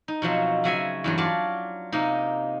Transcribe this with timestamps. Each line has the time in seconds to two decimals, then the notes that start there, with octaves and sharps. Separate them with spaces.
0.08 D#4
0.22 B2 F3 F#3 C4
0.64 C#3 F#3 E5 G#5
1.04 E2 G2 F#3
1.18 F#3 F4 D5 A5
1.92 C3 A#3 D#4